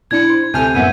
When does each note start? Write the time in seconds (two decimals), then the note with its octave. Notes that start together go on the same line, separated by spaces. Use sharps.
0.11 B1 D4 E4 G#6 C#7
0.29 C5
0.54 D2 C3 A4 G#5 F6 G6
0.75 F#1 F#2 A2 B3 E5 F#5 D#7